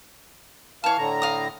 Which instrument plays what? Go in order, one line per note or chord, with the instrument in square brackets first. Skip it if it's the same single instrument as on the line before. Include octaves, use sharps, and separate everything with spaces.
[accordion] E3 F5 F6 [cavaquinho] C#5 A5
[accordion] A2 D3 A#5
[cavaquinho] F5 D#6